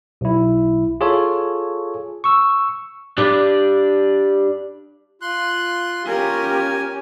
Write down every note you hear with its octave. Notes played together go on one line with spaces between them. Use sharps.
B1 E4
F4 G#4 A4 C#5
C#6 E6
D4 G4 D5
F4 C6 F#6
C#4 G4 A#4 G#5